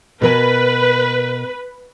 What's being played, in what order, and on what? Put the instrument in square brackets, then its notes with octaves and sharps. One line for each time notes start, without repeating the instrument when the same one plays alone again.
[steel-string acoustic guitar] B2 A#4 G#5 [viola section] B4